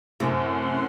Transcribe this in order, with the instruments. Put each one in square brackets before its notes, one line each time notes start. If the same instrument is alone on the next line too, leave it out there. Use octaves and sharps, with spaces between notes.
[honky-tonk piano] F#2 A2 [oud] C3 [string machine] C#4 F#5 C6